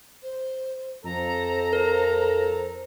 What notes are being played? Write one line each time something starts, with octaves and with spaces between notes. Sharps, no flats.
C5
F2 A4 C5 A#5
A#4